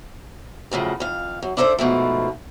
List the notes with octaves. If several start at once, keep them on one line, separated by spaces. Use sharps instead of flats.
F#2 A2 C#3 F3
F2 F5
F#2
D4 E4 A4 A#4 C5 E5
G#2 B2 F3 A3